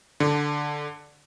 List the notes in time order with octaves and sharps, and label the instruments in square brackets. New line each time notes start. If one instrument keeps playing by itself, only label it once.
[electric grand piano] D3